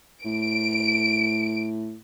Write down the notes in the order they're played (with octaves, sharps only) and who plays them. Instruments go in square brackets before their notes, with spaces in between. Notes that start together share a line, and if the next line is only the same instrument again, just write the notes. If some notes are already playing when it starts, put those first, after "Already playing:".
[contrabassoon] A2 [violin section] D7